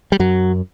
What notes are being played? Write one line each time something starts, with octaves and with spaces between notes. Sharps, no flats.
G3
F#2 F#3